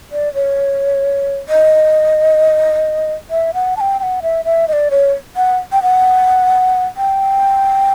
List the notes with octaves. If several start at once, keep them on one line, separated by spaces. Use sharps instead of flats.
D5
C#5
D#5
E5
F#5
A5
G5
G5
F#5
E5
E5
D#5
D5
C#5
F#5
G5
F#5
G5